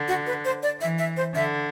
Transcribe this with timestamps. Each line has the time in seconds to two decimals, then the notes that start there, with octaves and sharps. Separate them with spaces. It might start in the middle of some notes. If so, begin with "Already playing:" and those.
Already playing: D3
0.08 F#4
0.27 B4
0.45 C5
0.63 D5
0.81 E3 E5
0.98 E5
1.17 C5
1.34 D3 E5